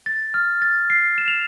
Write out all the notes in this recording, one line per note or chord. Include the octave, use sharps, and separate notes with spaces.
A6
F6
A6
C7
E7
F7